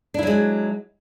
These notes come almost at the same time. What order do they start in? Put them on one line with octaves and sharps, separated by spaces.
D4 E4 F#3 G#3